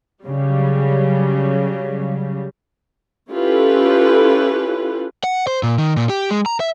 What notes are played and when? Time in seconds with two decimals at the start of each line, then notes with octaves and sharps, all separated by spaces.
0.25 C#3 F#3 G3
3.30 C#4 E4 F4 G4 A4 B4
5.24 F#5
5.47 C5
5.63 A#2
5.78 D#3
5.97 A#2
6.09 G4
6.31 G#3
6.46 A#5
6.60 E5